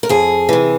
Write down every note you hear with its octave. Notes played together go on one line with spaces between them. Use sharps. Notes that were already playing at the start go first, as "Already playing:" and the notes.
A#4
F2 G#4
C3 E3